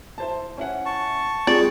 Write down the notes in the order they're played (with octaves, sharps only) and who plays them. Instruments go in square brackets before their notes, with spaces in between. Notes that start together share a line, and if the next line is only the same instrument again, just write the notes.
[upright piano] E4 C5 A5
C#4 E4 F#5
[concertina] A5 C#6
[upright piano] G3 G#3 G4 [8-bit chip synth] C4 F4 G#4 [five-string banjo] D5